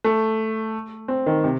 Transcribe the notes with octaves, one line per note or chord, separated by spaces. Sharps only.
A3
C4
D#3
C3